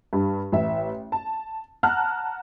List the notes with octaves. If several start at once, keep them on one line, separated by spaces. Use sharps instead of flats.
G2
A1 E5
A5
F#5 A5 A#5 F6 F#6